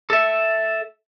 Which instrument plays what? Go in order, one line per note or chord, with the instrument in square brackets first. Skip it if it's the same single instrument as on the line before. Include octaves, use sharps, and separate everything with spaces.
[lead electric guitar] A4 E5